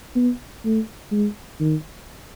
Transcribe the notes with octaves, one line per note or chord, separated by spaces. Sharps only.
B3
A3
G#3
D#3